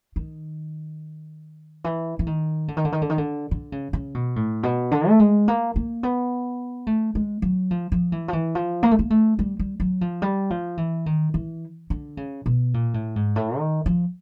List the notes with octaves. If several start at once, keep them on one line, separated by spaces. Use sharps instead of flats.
D#3
E3
E3
D#3
D3
D#3
D3
D#3
D3
D#3
D3
D3
C#3
C#3
B2
A2
B2
D3
A3
G#3
A#3
A#3
B3
A3
G#3
F#3
F3
F3
E3
F3
E3
F3
A#3
A3
A#3
A3
G3
G3
F#3
F3
G3
F3
E3
D#3
E3
D3
C#3
B2
A#2
A2
G#2
A2
D#3
F3